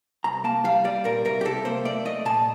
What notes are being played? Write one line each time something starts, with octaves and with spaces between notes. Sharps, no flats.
C2 A#5
A#3 A5
G3 F5
G3 D5
A#2 A#4
C2 A#4
G4
C2 A4
A#3 C5
A3 D5
A3 D#5
A#2 A5